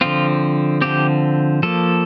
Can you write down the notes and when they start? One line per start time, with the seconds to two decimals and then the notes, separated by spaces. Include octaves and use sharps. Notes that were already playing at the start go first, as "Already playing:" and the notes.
0.01 D3 F3 C4 F4
0.81 D3 F3 C4 G4
1.63 F3 A#3 A4